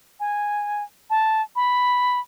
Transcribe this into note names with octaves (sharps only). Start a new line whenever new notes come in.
G#5
A5
B5